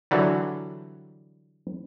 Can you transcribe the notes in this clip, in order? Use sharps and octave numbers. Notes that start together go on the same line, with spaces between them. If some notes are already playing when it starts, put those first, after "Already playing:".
D3 E3 F#3 G3